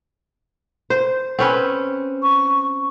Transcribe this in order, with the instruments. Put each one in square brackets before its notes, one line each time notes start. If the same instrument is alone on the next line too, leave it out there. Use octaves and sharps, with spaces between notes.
[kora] C5
C4 C#4 B4
[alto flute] C#6